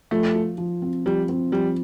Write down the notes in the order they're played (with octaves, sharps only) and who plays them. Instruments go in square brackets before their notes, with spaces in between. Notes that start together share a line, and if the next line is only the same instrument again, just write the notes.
[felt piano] F3 [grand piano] A3
[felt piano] F4
F3
C4
[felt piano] F3 [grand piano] G3
[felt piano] C4
[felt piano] F3 [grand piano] G3